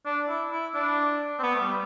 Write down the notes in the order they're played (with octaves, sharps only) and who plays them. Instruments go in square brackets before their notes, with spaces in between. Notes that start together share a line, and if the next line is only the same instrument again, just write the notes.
[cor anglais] D4
E4
E4
D4
C4
B3
A3
G3